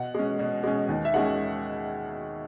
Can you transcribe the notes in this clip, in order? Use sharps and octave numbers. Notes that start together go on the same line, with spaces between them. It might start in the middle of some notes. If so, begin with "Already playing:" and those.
Already playing: B2 F#5
G#3 C#4
B2
G#3 C#4
D#2
E5
D#3 G#3 C#4 F#5